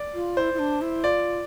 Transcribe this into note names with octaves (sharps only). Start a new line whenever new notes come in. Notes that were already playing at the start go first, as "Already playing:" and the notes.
Already playing: D5
F4
E4 C5
E4
D4
E4
F4 D5